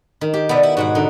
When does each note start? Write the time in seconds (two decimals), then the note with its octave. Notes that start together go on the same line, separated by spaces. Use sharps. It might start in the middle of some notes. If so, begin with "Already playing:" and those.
0.21 D#3
0.34 G4
0.49 C3 B3 D4
0.63 E4
0.77 G#2 B2 F#4 F#5
0.95 D3 D#4